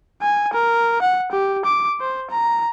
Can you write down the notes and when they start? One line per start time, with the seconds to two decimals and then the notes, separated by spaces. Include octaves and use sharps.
0.22 G#5
0.53 A#4
1.02 F#5
1.32 G4
1.65 D6
2.00 C5
2.31 A#5